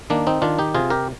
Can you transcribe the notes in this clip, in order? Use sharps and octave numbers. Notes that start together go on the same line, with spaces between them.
D#3 A#3 D4
C4 D#4
D#3 D4 F4
D#4 G4
C3 F4 G#4
G4 A#4